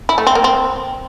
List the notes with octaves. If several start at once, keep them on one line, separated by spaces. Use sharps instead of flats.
E4
A3
C4
A#3
C4